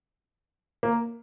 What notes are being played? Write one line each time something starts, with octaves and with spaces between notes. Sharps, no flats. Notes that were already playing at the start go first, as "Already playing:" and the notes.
A#3